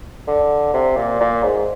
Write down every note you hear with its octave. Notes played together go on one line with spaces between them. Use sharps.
D3
C3
A#2
A#2
G#2